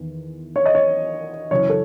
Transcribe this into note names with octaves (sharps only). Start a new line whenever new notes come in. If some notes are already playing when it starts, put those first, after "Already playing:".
Already playing: E2 D#3
C#5
D#5
C#5
F#2 C#3 E3 C#5
A4